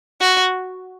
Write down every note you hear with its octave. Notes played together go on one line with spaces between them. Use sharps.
F#4